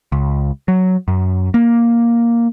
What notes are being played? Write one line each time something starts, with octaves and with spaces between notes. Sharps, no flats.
C#2
F#3
F#2
A#3